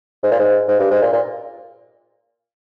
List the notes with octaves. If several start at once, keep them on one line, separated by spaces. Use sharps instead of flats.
G#2
A#2
G#2
G#2
G2
G#2
A#2
A#2